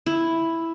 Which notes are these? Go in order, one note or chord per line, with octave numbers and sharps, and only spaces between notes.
E4